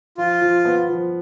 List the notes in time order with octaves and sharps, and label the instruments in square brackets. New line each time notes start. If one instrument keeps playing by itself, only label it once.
[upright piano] F3 [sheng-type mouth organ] F4
[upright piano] F3
B3
F3